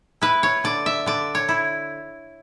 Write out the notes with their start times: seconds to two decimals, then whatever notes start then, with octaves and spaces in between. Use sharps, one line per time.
0.21 E4 B4
0.43 C#5
0.64 D3 D5
0.86 E5
1.06 D3 D5
1.35 C#5
1.49 E4